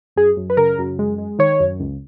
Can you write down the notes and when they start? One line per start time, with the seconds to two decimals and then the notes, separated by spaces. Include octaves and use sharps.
0.16 F#2 G#4
0.37 F#2
0.50 B4
0.57 C#3 A#4
0.78 F#2
0.99 G#3
1.18 G#3
1.39 D#3 C#5
1.60 F#2
1.80 C#2